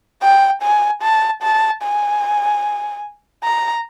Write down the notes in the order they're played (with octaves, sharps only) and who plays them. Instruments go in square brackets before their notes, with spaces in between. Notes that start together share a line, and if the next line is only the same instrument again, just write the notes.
[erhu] G5
G#5
A5
A5
G#5
A#5